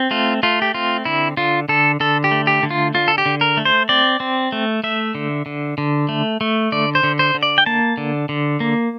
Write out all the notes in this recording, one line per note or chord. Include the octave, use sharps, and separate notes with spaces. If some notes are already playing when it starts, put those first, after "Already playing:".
Already playing: C4
A3 F4
A3 F4
G4
C4 F4
D3 E4
D3 F4
D3 A4
D3 A4
G4
A3
G4
D3
F4
D3 F4
A4
G4
D3
A#4
A3
C5
C4 D5
C4
A3
A3 E5
D3
D3
D3
A3
A3
D3 D5
C5
D3
C5
D3
D5
G5
A#3 A5
D3
D3
A#3